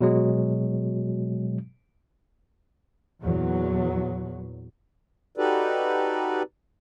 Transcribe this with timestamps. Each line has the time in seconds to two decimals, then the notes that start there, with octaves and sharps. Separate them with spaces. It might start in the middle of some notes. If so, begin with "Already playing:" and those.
0.01 B2 F#3 G#3
3.21 E2 A#2 F#3
5.37 D#4 F#4 G4 A4 B4 D5